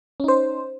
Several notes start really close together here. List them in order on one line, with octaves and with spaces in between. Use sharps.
C#4 D#4 C5